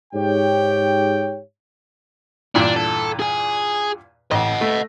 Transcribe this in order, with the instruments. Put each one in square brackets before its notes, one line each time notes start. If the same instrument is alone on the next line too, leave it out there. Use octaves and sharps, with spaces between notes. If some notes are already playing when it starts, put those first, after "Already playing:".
[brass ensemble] G#2 G4 C#5 G5
[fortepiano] E2 G2 A#2 [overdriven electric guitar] D4
[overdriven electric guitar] A4
G#4 G#5
[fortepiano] A1 [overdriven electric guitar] D#5 F#5
[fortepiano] A3